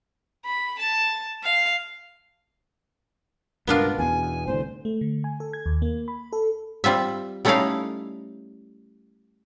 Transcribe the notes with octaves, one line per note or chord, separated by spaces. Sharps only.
B5
A5
F5
C#2 G2 B2 B3 D4 F4 A#4
E2 B2 G#5
C2 A2 D3 C5
A3
D3
G#5
A4
G#6
D#2
A#3
B5
A4
G3 C4 F4 E5
G3 A3 C#4 D#4 E4 F5